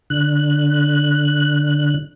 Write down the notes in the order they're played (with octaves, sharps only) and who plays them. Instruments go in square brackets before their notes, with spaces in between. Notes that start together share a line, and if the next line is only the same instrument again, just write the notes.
[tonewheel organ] D3 F#6